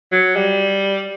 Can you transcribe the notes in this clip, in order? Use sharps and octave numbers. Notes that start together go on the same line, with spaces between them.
F#3
G3